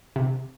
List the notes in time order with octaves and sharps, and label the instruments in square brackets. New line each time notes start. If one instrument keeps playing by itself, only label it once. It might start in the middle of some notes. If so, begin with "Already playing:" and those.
[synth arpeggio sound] C3